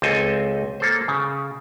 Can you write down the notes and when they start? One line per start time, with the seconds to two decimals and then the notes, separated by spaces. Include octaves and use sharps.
0.02 C#2 C4 A4 D#5 G#5
0.80 A#3 A4 C5
1.08 C#3